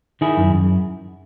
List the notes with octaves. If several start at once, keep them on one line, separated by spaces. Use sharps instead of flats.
D#3 E4 G#4
F#2
F#2